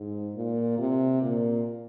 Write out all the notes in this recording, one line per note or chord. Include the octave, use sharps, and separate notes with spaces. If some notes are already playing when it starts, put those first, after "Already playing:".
Already playing: G#2
A#2
C3
A#2